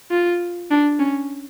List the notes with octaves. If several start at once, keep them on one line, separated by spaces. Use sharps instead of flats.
F4
D4
C#4